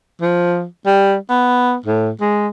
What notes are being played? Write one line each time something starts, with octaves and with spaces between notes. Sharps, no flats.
F3
G3
B3
A2
G#3